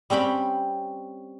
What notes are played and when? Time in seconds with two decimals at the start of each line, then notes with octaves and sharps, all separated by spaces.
0.10 G3 C4 C#4 G5 B5